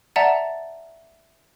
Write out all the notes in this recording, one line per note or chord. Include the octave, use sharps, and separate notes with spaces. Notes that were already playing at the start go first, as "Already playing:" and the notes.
D5 E5 F#5 A5 A#5 A6